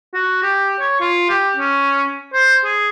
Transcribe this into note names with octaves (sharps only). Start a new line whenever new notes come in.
F#4
G4
C#5
F4
G4
C#4
C5
G#4